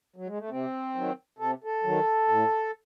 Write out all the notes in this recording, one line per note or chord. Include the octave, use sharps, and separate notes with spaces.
F#3
G#3
A3
C3 C4
D#3 F#3
C3 A4
A4
D#3 F#3
A2